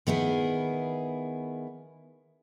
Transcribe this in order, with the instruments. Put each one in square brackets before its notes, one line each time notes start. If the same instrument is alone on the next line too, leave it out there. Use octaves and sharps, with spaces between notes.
[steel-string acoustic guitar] D#3 B3 E4 G#4